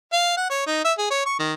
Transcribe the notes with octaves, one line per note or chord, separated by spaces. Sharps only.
F5
F#5
C#5
D#4
E5
G#4
C#5
C#6
D#3